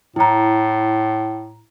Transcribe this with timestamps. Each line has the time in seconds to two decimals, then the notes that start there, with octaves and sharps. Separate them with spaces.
0.16 A2 E4 A#5